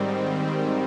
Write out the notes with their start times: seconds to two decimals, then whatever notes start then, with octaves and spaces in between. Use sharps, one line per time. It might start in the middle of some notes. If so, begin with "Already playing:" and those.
Already playing: G#2 D#3 G3 C4